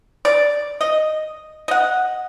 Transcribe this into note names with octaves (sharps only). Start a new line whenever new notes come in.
D5
D#5
D#5 F#5